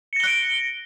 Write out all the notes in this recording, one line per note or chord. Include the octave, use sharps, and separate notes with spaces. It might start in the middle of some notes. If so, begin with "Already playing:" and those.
F#6 A#6 C#7 D7 G7